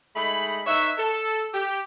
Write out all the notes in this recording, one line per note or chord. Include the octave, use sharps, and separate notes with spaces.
G#3 A3 D#4 B5
D#4 B4 C#5 E5
A4
G4